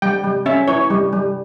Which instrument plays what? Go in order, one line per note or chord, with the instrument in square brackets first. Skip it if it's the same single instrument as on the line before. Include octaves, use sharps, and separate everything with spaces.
[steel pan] G3 G5
G3
C#4 E5
E4 C#5
G3
G3